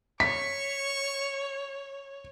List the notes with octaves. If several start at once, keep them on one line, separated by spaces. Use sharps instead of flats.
C#5 C#6 B6